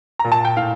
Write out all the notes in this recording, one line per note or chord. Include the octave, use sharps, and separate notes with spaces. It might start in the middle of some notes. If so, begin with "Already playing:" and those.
A#5
A#2
A5
G5
A2 F5